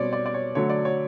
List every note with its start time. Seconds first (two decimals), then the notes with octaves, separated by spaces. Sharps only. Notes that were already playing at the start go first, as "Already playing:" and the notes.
Already playing: B2 G3 C4 C#5 D5
0.13 D5
0.26 D5
0.34 C#5
0.55 D3 F#3 A3 C#5
0.70 D5
0.85 C#5